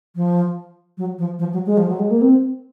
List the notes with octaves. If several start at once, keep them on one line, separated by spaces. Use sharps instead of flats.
F3
F#3
F3
F3
F#3
G#3
F3
F#3
G#3
A#3
C4